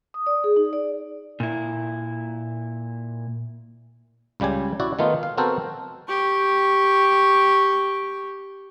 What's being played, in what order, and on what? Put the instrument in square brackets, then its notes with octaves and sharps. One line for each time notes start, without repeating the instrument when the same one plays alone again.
[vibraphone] D#6
D5
G#4
D#4
D5
[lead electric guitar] A#2 E4
[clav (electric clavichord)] C#2 C#3 G3 G4 G#5
E4 F#4 D5
D#3 A3 B3 D#4 F4
F5
B3 C4 F#4 A4 A#4 C5
[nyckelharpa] G4 C#6